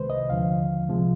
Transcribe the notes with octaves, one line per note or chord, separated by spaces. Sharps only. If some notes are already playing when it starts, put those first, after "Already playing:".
Already playing: C2 C3 D#3 G#3 B4 C5
D#5
D#2 D3 F3 F5
C2 C3 F3 G#3